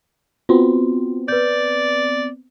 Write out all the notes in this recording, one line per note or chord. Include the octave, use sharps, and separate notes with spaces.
B3 C4 F4 F#4 C6
B4 D5 G6